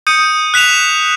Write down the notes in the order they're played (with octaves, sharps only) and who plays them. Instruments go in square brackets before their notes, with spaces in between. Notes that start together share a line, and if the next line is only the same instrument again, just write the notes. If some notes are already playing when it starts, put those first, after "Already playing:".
[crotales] D#6 G6 C#7 D#7
F#6 B6 E7 F7